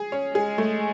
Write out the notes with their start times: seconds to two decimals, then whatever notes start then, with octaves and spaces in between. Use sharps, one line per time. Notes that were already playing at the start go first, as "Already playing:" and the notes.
Already playing: G#4
0.12 C#4
0.34 G#3 G#4
0.58 A3